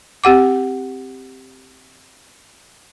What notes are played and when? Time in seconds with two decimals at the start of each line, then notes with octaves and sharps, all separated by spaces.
0.24 C4 G4 F#5 D6